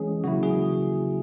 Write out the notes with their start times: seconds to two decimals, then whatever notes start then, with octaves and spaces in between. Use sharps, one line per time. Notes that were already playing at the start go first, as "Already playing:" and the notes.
Already playing: E3 G#3 C#4 G#4
0.24 C#3 F#3 A#3 E4 F#4
0.43 G#4